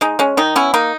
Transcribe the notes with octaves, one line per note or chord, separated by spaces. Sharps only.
G#3 D#4
G#3 C#4
D#3 D#4
B3 C#4 E4
A#3 D#4